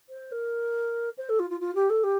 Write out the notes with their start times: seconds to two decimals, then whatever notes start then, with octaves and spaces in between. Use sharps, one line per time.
0.09 C5
0.31 A#4
1.17 C5
1.29 A4
1.39 F4
1.50 F4
1.60 F4
1.75 G4
1.89 A4
2.03 G4